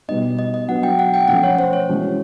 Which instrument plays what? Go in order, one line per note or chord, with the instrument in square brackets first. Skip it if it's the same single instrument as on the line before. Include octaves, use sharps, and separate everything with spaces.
[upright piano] B2 G3 B3 D#4 [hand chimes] D#5
[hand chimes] D#5
D#5
[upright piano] F#3 B3 D4 [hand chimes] F#5
[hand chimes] G5
F#5
G5
[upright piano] F3 A3 C#4 [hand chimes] F#5
[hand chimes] C#5
C5
C#5
[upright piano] E3 G#3 C#4 F#4